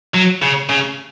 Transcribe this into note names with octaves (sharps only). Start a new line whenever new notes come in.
F#3
C#3
C#3